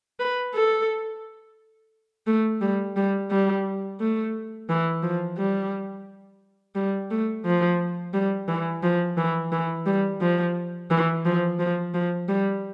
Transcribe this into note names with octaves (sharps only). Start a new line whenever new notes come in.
B4
A4
A3
G3
G3
G3
A3
E3
F3
G3
G3
A3
F3
G3
E3
F3
E3
E3
G3
F3
E3
F3
F3
F3
G3